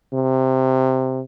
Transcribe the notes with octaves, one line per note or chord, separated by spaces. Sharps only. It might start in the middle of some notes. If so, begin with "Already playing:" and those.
C3